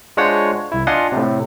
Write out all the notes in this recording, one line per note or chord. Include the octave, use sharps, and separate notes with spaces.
G#3 D4 F4 C5 C#5 F#5
C2 E4
D4 F4 D#5 F#5 G#5 C6
A2 C3